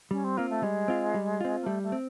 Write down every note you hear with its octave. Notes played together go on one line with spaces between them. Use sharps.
G3 C#4
C4
A#3 C4 F4
A3
G3 G#3
C4 F4
G3
C4 F4
A#3
G3 A3
A3
C4